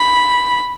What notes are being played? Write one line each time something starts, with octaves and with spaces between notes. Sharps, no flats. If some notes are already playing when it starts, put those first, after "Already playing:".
Already playing: B5